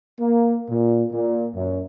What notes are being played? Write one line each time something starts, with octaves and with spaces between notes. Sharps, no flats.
A#3
A#2
A#2
F#2